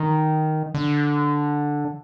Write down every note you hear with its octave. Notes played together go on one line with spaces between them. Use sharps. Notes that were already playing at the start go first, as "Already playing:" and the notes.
Already playing: D#3
D3